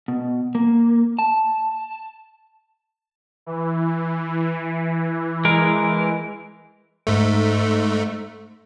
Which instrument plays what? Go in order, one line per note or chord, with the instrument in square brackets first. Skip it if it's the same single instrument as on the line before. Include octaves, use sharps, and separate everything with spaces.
[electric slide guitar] B2
A#3
A5
[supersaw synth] E3
[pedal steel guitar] G#3 A#4
[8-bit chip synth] G#2 A3